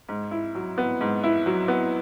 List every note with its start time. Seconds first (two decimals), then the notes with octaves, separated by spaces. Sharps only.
0.09 G#2
0.31 E4
0.55 F#3
0.78 B3
1.01 G#2
1.24 E4
1.46 F#3
1.68 B3